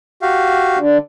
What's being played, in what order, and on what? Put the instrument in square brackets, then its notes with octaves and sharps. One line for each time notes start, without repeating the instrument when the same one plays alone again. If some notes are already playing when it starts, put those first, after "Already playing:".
[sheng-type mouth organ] F#4 G4 F5
[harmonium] D3